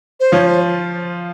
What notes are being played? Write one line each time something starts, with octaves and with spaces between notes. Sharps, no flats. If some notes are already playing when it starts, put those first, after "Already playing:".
C5
F3 F4 C#5
C5